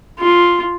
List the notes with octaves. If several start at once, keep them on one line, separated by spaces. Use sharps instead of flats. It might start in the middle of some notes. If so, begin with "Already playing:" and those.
F4